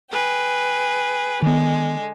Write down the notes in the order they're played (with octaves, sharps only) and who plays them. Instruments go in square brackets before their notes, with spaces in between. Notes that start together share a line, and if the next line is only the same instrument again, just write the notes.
[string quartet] G#4 B4 G5
[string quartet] D3 G#3 [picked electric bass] D#3 B3